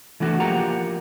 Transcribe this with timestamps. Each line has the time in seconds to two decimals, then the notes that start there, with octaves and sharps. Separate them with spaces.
0.20 E3 A3 D4 F#4
0.40 F3 A#3 G4 F#5 A#5